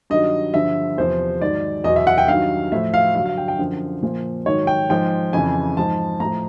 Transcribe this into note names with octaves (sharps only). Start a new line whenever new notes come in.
G2 D#3 F#3 D#5
G2 D3 F3 E5
E2 C3 F3 C5
G#2 D#3 F#3 D5
E2 B2 F#3 D#5
E5
F#5
G5
G2 D#3 F#3 F5
A2 F3 E5
F5
G2 D3 F#3 F5
F5
G5
G5
F#2 D3 F3
A#2 F3
G#2 D#3 F#3 C#5
G5
G#2 F3 G5
F2 C#3 E3 G#5
G#2 F3 A5
A2 F3 A#5